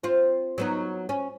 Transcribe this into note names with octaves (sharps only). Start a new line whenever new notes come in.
C4 F4
F#3 B3 D#4
C#4